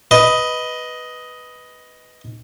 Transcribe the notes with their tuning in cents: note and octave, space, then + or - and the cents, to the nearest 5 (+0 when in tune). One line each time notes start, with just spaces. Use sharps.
B4 +0 D#5 +10